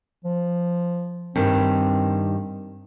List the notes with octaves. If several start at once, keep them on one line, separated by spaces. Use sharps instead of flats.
F3
G2 D#3 C4